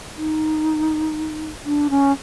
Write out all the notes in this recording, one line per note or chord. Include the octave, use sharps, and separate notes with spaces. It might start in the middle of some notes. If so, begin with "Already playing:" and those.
D#4
D4
C#4